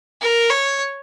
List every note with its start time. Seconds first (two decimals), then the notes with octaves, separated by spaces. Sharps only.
0.21 A#4
0.50 C#5